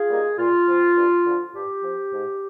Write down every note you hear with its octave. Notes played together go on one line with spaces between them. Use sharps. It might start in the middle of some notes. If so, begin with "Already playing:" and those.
Already playing: F4 G#4
G3 A#3 D#4
A#2 F4
F3 C4
G2
D3 F3
G2 G4
F3 C4
G#2